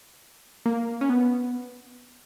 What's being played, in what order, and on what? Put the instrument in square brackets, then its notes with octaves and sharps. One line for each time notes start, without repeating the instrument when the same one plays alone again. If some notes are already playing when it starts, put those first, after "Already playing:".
[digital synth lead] A#3
C#4
B3